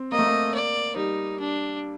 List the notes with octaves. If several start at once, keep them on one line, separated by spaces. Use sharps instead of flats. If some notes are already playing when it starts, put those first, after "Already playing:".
Already playing: C4
A#3 D#5
A3
A#3
D5
G3 D#4
D4